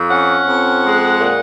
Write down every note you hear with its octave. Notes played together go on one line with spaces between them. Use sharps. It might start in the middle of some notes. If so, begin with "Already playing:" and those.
Already playing: F2
C#4 F#5
F2
G#3
A#2